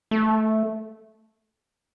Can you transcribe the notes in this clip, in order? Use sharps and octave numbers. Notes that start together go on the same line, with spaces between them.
A3